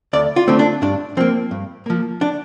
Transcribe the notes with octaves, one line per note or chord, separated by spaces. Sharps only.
D2 D5
F4
D3 A3 C4
D4
G2 D4
F3 A#3 C4
G2
F3 A#3
D4